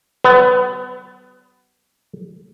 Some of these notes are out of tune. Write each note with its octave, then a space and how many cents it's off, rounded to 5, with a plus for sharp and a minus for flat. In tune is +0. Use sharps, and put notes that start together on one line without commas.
G3 -45 B3 +20 B4 +35